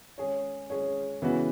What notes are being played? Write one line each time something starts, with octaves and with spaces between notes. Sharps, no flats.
G#3 C#4 G#4 C#5
G#3 C#4 G#4 C#5
C#3 E3 G#3 B3 F#4